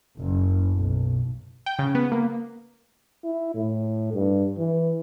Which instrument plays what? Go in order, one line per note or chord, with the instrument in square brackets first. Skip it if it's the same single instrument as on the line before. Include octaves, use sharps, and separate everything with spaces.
[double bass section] F#1
B1
[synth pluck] G5
C#3
B3
A#3
[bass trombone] E4
A2
G2
E3